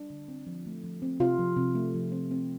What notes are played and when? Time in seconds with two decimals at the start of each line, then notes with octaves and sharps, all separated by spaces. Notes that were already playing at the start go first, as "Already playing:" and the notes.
Already playing: G3 D4
0.10 D3
0.28 C4
0.47 F3
0.66 A3
0.84 F3
1.02 C4
1.20 C3 F4
1.39 F3
1.57 C3
1.75 A3
1.94 F3
2.12 C4
2.31 C4